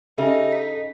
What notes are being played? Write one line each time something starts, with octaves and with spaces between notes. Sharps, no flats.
C#3 D#4 G4 A4 D#5 E5
B6